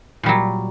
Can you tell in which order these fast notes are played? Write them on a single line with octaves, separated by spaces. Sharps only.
A#2 G3 F#3